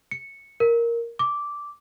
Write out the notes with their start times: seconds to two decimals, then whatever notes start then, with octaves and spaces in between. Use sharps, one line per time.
0.11 C#7
0.60 A#4
1.19 D6